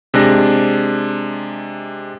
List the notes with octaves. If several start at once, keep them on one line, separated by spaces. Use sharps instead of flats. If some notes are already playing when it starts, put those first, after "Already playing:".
C3 G#3 D4 A#6